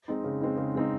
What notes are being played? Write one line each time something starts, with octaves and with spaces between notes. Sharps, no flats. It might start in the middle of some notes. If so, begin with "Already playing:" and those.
G#3 C4 D#4
C#3
G#3 C4 D#4
C#3
G#3 C4 D#4